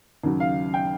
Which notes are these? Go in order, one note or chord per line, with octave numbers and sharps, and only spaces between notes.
D#2 C#3 F#3
F5
G5